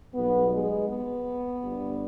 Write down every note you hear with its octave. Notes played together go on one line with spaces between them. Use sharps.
B1 B2 G3 B3
G#3
B3
G1 G2 D3 G3